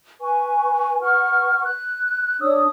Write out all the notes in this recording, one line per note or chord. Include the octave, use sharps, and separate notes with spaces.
B4 G#5 C#6
B4 F#5 C#6 F6
F#6
D4 C#5 D#6 E6